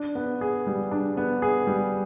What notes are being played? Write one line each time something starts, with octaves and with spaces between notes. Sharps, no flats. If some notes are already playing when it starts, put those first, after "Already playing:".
Already playing: D4
B3
G#4
G3
D4
B3
G#4
G3